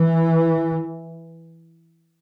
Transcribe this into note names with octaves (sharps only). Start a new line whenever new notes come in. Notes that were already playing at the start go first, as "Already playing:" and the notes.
Already playing: E3